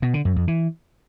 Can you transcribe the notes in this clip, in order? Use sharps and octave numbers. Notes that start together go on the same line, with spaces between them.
B2
D3
F#2
F2
E3